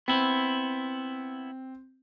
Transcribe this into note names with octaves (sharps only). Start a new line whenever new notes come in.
B3 C4 E4